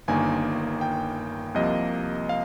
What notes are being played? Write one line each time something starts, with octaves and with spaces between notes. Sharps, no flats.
G1 G2 D#3 A#3 G#5
G5
C2 C3 F3 A#3 D#5
F5